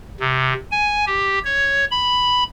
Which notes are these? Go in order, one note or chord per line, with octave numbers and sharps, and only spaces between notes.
C3
G#5
G4
C#5
B5